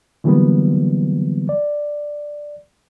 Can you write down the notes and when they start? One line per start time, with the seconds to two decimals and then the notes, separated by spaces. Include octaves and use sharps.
0.24 D3 E3 F#3 G3 A#3 B3
1.49 D5